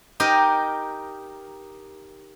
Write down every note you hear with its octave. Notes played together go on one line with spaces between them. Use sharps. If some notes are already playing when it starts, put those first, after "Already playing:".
D#4 G4 A#4 D#5